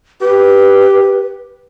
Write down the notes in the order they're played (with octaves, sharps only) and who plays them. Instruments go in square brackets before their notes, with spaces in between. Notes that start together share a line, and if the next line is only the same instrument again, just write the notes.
[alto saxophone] G4 [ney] B4